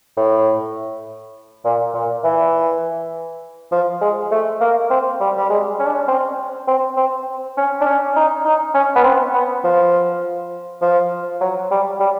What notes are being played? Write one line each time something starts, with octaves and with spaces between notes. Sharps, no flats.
A2
A#2
A#2
E3
F3
G#3
A3
A#3
C4
G3
G3
G#3
C#4
D4
C#4
C4
C4
C4
C#4
D4
C#4
D#4
D#4
C#4
B3
C4
B3
F3
F3
F#3
G3
G3